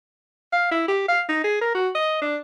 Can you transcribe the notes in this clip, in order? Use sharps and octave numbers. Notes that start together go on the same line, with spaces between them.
F5
E4
G4
F5
D#4
G#4
A#4
F#4
D#5
D4